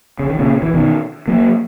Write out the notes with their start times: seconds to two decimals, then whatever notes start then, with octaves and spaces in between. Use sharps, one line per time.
0.19 C#3
0.29 D#3
0.39 A#2 C#3
0.62 E3
0.74 B2 D#3
1.28 F#3 A#3